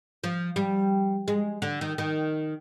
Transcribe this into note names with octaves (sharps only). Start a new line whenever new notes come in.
F3
G3
G#3
D3
D#3
D#3